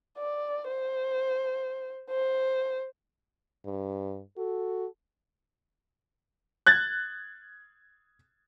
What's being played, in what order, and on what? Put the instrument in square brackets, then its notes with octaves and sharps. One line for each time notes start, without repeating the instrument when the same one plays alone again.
[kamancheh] D5
C5
C5
[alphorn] G2
[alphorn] F#4 [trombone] A4
[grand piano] F#6 G#6 A6